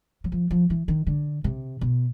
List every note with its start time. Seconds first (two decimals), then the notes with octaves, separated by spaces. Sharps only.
0.24 F#3
0.32 F3
0.51 F3
0.70 E3
0.88 D#3
1.07 D3
1.44 C3
1.81 B2